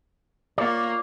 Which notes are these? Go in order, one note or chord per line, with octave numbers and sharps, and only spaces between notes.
A#3 F4 C#5 D5